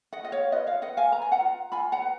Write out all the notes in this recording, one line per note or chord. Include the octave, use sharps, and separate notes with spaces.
D#5 F#5
F4 D#5
C#5 F5
F4 B4 D#5
C#5 F5
B4 D#5 F#5
F5 G#5
B4 A#5
G#5
F#5 A#5
F4
F4 G#5 B5
F#5 A#5
B4